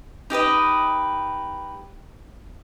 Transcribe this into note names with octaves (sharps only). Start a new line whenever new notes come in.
D#4 G4 B4 D#5